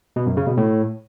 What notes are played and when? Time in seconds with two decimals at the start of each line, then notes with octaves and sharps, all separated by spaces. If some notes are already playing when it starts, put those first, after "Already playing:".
0.16 B2
0.26 F#2
0.37 C#3
0.47 B2
0.57 A2